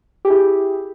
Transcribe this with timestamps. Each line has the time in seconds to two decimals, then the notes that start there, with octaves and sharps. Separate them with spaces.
0.25 G4
0.27 G#4
0.30 E4